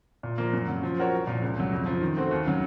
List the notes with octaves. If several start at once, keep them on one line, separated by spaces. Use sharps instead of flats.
A#2
F3 A#3
F#2
C#3 F#3
F3
C4 F#4 A#4 C#5
C2
A#2 F3
C#2
C3 F#3
F2
C#3 F3
D#3
A3 C4 F#4 C5
D#2
C#3 F#3